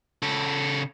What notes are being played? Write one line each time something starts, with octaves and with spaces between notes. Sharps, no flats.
C#3 A4